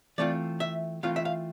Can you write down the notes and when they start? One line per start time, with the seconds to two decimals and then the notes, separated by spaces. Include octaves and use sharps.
0.18 E3 A3 C4 F4 D5
0.60 E5
1.03 E3 A3 C4 F4 F5
1.16 E5
1.25 F5